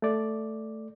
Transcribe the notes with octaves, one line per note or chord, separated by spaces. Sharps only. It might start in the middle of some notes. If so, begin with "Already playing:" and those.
A3 D5